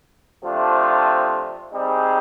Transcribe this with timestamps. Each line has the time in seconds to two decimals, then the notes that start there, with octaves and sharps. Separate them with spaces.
0.44 C3 F3 A3 D4 F4
1.73 G3 C4 D#4 G#4